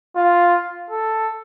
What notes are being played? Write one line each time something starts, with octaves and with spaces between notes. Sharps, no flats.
F4
A4